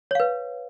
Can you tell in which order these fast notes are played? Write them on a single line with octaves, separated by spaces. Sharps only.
C#5 F5 B4